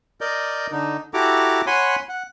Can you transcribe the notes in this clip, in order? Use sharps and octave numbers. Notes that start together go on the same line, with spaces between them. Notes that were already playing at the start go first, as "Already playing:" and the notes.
A#4 D5 D#5 G6
D3 D#4
E4 F#4 G4 A4 A#5 D6
C#5 F#5 G#5 B5 C6
F#5